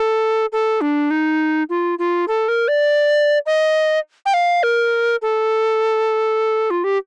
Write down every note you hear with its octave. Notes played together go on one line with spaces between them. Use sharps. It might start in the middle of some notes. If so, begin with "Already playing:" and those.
Already playing: A4
A4
D4
D#4
F4
F4
A4
A#4
D5
D#5
G5
F5
A#4
A4
F4
G4